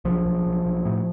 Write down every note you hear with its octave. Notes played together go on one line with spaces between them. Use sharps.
B1 F3
B1
B1
B1
A2